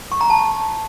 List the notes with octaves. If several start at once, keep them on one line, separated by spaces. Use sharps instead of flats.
C#6
A#5
A5